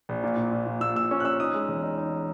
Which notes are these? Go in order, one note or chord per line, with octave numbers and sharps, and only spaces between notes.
A#1
A#2
A#2
A#2
A#2
A#2 E6
A#2 E6
C#4 C#6
F#6
C#4 E6
D#4 D#6
G#3
E2
D#4
D#4